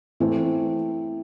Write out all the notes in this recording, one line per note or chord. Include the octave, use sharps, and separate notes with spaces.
E3 A3 C4